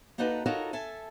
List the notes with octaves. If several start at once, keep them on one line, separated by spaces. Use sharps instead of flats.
A#3 D4 D#4 F#4 A4 B4
D#4 F4 F#4 A4 A#4 C#5
A4 E5 G#5 A5